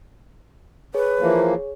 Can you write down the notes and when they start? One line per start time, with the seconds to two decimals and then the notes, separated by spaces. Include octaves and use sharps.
0.94 G#4 B4 C#5
1.21 E3 F3 A#3